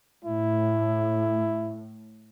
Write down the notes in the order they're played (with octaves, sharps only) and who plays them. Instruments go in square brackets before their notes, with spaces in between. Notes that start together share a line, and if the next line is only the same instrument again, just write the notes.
[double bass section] A2 [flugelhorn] E4